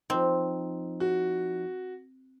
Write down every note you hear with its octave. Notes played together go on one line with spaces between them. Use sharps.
F3 C4 D#4
F#4